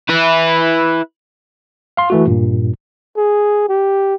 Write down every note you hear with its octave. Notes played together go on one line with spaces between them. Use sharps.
E4 B4
F5 C6
E3 A3 F#4
G2 A#2
G#4
G4